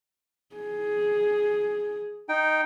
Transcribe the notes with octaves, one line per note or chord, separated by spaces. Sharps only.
G#4
D#4 G5